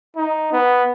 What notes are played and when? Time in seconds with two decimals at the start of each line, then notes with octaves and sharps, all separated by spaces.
0.16 D#4
0.52 B3